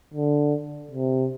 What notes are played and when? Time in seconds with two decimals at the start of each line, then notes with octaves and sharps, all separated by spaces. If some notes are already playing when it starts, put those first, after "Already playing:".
0.14 D3
0.91 C3